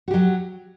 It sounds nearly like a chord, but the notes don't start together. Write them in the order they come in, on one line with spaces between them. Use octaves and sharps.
F#4 G4 F#3